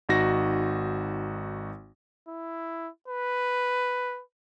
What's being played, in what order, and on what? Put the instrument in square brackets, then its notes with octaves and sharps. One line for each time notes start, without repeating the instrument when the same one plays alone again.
[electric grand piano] G#1 D#4 F#4 A#6
[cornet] E4
B4